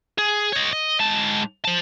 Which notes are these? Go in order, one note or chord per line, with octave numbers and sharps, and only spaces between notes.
G#4
C#5 D#5
D#5
G#2 A5
C5 A5